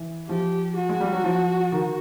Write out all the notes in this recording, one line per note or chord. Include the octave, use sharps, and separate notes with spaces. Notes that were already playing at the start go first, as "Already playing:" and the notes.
Already playing: E3
F3 G4
F#4
G#3
G3
F#3
F3
D#3